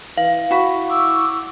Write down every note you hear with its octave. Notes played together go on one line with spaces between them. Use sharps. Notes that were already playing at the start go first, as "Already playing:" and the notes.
E3 F5
E4 F#4 B5
C#6 D6 E6